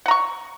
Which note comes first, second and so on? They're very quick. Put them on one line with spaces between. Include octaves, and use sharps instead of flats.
F#5 A#5 C#6